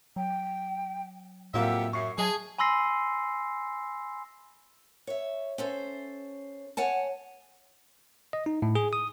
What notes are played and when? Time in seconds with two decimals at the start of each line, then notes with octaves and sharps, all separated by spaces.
0.16 F#3 G5
1.54 F2 A2 F#3 A#3 F4 G4 E5 F#5
1.93 F#2 E5 C#6 C7
2.18 F#3 G#4 A5
2.58 G#5 B5 C6 E6 A#6 C7
5.07 C#5 E5
5.58 C#4 A4 C5
6.77 C#5 F#5 G#5 A5
8.33 D#5
8.46 D#4
8.62 A2
8.75 G#4
8.93 D#6